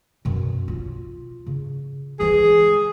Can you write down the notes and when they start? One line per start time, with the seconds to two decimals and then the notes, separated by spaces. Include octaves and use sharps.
0.25 F#2 B2
0.68 F4
1.46 C#3
2.20 E3 G#3 G#4